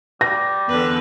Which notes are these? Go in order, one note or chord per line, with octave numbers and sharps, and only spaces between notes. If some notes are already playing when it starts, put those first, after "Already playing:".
G3 A#6
E2 D3 B4